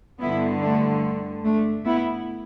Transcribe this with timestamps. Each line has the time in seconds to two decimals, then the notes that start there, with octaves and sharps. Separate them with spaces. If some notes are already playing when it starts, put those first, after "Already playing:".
0.21 G2 D3 B3 E4
0.62 A3 D4
1.45 A3 D4
1.86 B3 E4